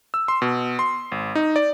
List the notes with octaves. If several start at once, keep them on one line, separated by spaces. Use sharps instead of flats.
E6
C6
B2
C6
G#1
D#4
D5